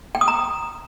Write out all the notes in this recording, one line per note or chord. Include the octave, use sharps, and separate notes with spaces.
G5
D#6
A#5